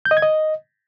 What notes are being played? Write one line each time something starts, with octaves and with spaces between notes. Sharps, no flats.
G6
D#5
G#6
D#5